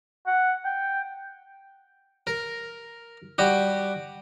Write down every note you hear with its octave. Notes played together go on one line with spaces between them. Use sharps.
F#5
G5
A#4
G3 F#4 G4